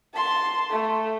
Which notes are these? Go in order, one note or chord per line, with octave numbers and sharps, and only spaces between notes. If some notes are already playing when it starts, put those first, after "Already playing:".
A5 C6
A3